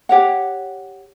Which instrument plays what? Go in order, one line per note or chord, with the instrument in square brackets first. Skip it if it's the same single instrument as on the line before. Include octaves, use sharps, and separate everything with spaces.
[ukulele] G4 C#5 F#5